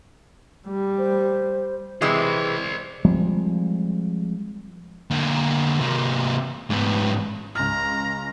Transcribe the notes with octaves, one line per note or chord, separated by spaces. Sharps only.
G3
C5
C3 E3 G#3 C5 D5
F3 G3 G#3 C4
D3 A#3
C3 A#3
G#2 B3
C#2 A#5 F6